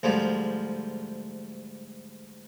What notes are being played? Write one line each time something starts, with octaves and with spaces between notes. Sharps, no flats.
D2 G#2 F3 G3